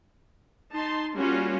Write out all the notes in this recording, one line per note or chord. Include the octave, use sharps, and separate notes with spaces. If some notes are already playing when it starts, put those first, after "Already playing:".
D#4 A5 C6
G3 A#3 C#4 F4 F#4